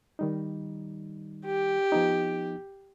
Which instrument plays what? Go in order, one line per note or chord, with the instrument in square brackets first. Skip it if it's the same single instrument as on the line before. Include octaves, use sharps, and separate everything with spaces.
[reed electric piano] D#3 G3 D#4
[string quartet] G4
[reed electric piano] F3 B3 D#4